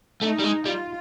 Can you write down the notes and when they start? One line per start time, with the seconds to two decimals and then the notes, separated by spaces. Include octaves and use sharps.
0.21 A3 D#4
0.39 G3
0.44 G#3
0.65 G3 F4